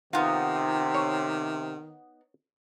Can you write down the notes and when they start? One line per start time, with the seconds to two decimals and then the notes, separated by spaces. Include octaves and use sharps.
0.13 C3 D#3 B3 D#4 F4
0.94 C#5